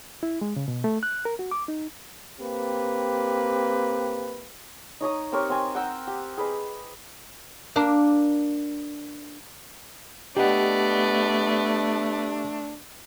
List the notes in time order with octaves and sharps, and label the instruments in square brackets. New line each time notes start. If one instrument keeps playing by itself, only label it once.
[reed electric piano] E4
G#3
C#3
B2
A3
F#6
A#4
F#4
D6
D#4
[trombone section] A#3 C4 G4 B4
[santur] D#4 C#5 A#5 D#6
C4 G4 A#4 C#5
C4 G#5
F#5 G5 A#5 E6
G4
G#4 B4 D#5
[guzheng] A#3 D4
[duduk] A3 [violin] B3 D5 [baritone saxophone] D4 [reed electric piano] G4 D#5 F#5